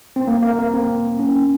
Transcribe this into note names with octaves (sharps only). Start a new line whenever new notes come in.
C4
A#3
A#3
A#3
C4
C#4